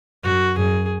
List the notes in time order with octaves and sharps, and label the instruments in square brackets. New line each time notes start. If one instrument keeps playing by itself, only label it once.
[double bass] F#2 [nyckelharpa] F#4
[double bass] F#2 [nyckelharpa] G#4